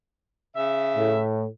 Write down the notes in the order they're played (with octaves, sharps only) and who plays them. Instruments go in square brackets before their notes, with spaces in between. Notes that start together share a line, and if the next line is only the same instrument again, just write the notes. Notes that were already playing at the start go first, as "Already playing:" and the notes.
[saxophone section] C#3 E5
[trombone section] A2